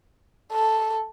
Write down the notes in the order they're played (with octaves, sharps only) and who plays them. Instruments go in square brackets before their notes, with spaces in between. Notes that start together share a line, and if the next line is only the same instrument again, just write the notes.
[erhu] A4